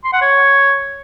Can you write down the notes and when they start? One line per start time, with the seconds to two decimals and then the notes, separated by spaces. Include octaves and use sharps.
0.04 C6
0.13 F#5
0.22 C#5